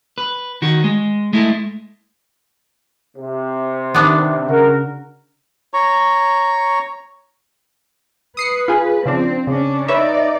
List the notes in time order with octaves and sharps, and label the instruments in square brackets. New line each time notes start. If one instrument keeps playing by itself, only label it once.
[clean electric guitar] B4
D#3 F#4
G#3
G#3 A3 E4
[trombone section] C3
[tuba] D#3 [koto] B3 D4
[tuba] C#3 [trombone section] F#4 A#4
[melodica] C#5 A#5 C#6
[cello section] B4 [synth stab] D#6 C7 C#7
[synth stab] F4 G#4
[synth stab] C#3 F3 D4 [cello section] C4
[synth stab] C#3 [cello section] C#4 D4
[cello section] D#4 D5 [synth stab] B4 C#5 E5